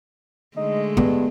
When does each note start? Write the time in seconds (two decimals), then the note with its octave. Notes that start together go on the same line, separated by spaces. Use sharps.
0.57 D3 G#3 A3 D#4
0.97 G2 B3